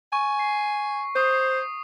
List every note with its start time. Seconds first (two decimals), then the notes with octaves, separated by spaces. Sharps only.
0.13 G#5 C#6
0.39 C7
1.16 C5 C#6 D#6